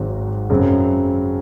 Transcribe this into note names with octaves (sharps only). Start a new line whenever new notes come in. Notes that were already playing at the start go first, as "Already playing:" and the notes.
Already playing: G#1 G#2 F#3 C4 F#4
F#2 C#3 F#3 C4